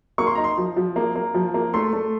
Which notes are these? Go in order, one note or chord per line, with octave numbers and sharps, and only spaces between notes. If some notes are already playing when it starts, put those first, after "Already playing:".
A#3 C#6
C6
D#4 A#5
C6
F3
F3
A#3
A#3
F3
A#3
A3 C6
A3